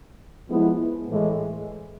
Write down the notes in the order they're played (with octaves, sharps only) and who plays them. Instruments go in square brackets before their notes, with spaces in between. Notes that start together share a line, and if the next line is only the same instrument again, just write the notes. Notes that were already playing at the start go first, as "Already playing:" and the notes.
[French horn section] F3 G#3 B3 E4
A2 E3 G#3